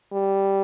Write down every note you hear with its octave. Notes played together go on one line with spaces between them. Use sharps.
G3